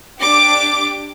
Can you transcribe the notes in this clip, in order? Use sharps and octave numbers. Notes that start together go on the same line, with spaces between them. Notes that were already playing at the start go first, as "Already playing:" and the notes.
D4 G4 D6